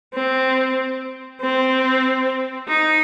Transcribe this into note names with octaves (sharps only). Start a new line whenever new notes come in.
C4
C4
D#4